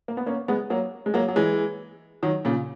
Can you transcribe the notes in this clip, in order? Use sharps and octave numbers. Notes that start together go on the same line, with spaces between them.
A#3
B3
A#3 C#4
G#3 B3
F#3 A#3
G#3
F#3 A#3
F#3
E3 G#3
D#3 F#3
A#2 C#3